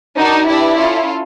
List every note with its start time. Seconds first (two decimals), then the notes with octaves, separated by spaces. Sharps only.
0.17 D4 D#4 F#4 A#4 D5
0.47 D4 E4 G4 B4 D5
0.77 C#4 F4 A4